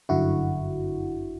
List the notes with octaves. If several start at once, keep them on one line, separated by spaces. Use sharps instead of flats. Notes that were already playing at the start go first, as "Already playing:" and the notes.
G1 F#2 D3 E4 F#4